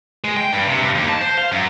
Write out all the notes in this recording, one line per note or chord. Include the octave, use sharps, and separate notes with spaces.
G#3
G5
G2
C3
G2
D#2
A5
C5
F5
F#2